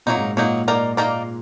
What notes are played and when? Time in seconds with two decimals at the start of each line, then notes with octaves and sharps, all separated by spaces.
0.06 A#2 F#3 A#3 D#4
0.17 G#2
0.36 A#2 F#3 A#3 D#4
0.68 A#3 D#4 A#4 D5
0.97 A#3 D#4 A#4 D5